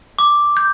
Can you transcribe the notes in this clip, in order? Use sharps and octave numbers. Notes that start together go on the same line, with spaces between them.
D6
G6